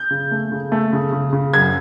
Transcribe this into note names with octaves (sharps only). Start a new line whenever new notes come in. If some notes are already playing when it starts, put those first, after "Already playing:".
Already playing: G6
C#3
A3
C#3
A3
C#3
C#3
C#3
F#2 G#6